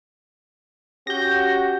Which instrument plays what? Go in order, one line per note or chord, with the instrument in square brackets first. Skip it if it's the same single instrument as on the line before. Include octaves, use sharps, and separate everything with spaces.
[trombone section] C#4 F#4 G4 [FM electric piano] G6 A#6